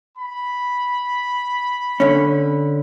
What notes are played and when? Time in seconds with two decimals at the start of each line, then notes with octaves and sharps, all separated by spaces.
0.17 B5
2.00 D3 C#4